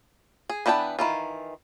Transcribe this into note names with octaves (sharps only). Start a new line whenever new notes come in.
G#4
E3 B3 D4 G5 A5
D#3 E3 F4